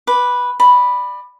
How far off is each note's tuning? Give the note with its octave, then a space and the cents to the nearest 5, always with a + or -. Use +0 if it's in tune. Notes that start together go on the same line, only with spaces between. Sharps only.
B4 -5 D6 +0
D5 +30 B5 +0